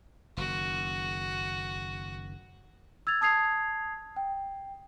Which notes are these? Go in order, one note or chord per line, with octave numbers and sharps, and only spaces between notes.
F#1 D#3 F#4
E6 G#6 A6 F7
A5 D#6 G#6 C7 F7
G5